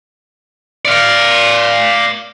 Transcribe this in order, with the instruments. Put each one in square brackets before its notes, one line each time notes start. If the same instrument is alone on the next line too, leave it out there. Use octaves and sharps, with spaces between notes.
[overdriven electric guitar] D5 F5